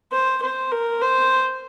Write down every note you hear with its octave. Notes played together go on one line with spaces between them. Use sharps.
C5
C5
A#4
C5